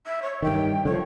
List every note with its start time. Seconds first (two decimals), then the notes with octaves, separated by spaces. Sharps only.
0.06 E5
0.22 C#5
0.42 G2 D#3 G5
0.85 D3 F3 C#5